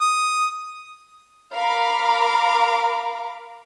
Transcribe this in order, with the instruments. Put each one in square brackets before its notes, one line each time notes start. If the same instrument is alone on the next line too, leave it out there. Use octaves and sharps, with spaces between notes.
[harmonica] D#6
[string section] A#4 F5 A#5 B5 D6